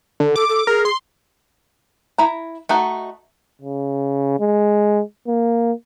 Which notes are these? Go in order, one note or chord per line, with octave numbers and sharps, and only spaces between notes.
D3
A4 D6
A4
G#4 A#4
C6
E4 A#5
A3 D#4 F#4
C#3
G#3
A#3